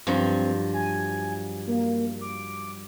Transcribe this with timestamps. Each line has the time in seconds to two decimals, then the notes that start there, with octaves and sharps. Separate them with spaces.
0.07 G2 F3 F#3 C4
0.74 G#5
1.67 A#3
2.21 D6